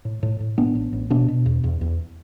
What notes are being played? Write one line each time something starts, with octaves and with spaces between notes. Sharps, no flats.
A2
A2
A2
A2 B3 D4
A1
A1
B2 B3 D4
B2
E2
E2
E2